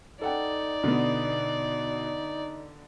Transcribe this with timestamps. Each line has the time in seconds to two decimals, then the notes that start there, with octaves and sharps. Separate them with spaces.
0.21 D#4 A4 D5 F#5 G5
0.83 B2 D3 B3